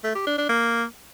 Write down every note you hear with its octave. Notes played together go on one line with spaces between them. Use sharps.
A3
G4
D4
D4
A#3